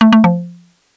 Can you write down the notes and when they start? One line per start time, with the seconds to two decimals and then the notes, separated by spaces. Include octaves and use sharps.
0.01 A3
0.13 A3
0.24 F3